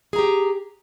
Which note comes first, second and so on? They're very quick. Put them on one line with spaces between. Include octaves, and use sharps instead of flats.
G#4 A#5 G4